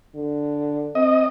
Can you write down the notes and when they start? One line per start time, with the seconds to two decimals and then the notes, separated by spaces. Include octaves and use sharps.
0.15 D3
0.95 C4 D#5